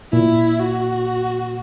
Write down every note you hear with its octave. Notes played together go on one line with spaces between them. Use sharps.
A#2 E4
F#4